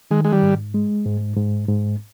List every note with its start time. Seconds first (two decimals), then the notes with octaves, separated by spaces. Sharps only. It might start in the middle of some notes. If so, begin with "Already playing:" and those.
0.11 D#3 G#3
0.25 G#3
0.32 G3
0.42 G#2
0.74 G#3
1.06 G#2
1.36 G#2
1.68 G#2